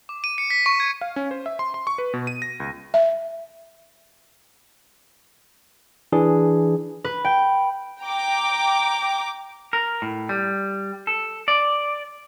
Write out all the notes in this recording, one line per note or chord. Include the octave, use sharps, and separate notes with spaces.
D6
D#7
C#7
B6
C#6
G#6
F5
C#4
C5
E5
C6
C6
C#6
B4
B2
D#7
A#6
C#2
E5
E3 D4 G#4
B4
G5
G5 A#5 D6
A#4
A2
G3
A4
D5